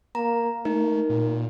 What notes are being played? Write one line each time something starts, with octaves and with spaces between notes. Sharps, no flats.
A#3 A#5
A3 D#4 A#4
A#2